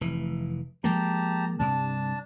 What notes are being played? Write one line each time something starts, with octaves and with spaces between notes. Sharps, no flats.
F1 E3
F3 G#3 A#3 G4 A5 A#5
G2 C3 D4 A5